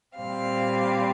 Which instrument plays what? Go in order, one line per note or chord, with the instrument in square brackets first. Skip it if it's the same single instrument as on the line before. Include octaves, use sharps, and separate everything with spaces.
[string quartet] A#2 G3 C4 F5